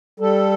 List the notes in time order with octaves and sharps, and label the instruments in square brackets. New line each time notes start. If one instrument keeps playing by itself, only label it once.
[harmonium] G3 A4